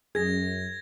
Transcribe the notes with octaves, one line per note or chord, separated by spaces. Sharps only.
F#2 G#4 G#6 A#6